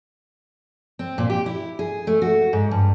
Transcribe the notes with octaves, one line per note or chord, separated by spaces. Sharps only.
C4
A#2
G4
E4
G#4
A3
F#4
G#2
G2